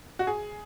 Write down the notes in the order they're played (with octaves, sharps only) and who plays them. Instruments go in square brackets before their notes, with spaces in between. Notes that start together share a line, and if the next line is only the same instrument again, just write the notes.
[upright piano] F#4
G#4